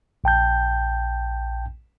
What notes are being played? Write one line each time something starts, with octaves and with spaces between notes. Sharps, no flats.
A#1 G5 A5 G6